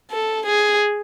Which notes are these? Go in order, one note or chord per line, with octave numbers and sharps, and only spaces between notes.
A4
G#4